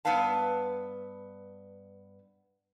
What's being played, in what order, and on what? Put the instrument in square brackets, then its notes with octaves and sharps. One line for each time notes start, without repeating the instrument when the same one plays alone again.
[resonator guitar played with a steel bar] G2 B3 B4 F5 A5